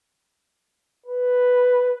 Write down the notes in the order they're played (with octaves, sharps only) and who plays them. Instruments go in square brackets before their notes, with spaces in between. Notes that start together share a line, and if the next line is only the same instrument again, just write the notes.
[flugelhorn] B4